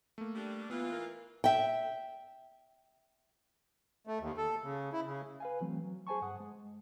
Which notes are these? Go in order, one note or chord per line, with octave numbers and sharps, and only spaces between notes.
A3 A#3
G3 D4
E3 B3 F4
A#4
E5 G5
A3
D#2
A4
C#3
E4
C#3
B4 F5 G#5
E3 F#3 A3 C4
F#3
G#4 C5 G#5 A5 C#6
G2 F#5 D#6
G#3